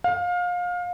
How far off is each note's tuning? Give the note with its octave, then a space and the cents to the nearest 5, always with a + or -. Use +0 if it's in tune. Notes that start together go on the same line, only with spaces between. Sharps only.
F5 +30